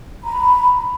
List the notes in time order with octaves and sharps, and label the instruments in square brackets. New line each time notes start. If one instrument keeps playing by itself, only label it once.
[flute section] A#5 B5